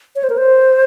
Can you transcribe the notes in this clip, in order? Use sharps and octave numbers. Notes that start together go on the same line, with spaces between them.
C#5
C5
A#4
C5